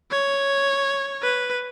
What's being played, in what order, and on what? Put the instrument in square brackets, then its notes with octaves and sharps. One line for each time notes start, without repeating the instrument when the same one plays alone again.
[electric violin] C#5
B4